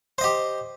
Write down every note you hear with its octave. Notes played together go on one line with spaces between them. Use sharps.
G4 C5 D#5